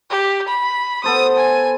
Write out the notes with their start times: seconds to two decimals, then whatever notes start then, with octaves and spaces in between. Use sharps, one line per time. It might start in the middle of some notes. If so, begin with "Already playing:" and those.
0.10 G4
0.48 B5
1.04 B3 A4 C5 D#6
1.37 G#5